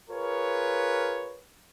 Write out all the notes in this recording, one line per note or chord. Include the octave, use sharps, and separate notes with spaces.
F4 G#4 A#4 B4 C#5